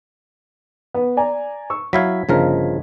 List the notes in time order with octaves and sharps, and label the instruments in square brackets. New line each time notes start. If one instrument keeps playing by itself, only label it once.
[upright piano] B3
D5 G#5 A#5
C#6 E6
[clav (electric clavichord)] F#3 E4 F5 [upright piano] G#6 B6
[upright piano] G1 D#5 [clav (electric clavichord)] C#3 F3 A#4